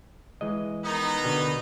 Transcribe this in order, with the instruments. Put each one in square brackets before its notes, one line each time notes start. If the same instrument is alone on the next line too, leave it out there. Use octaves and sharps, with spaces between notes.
[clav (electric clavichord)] E3 G#3 D#5
[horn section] D#3 B3 D#4
[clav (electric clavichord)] B2 D3